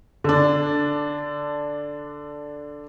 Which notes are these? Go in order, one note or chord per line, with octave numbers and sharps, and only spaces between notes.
D3 D4